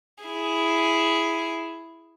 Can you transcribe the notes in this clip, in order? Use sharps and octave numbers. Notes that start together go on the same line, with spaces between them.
E4 G#4